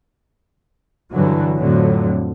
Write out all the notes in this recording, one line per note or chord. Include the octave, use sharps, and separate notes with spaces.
G2 D3 E3 F#3
F2 A2 D3 F#3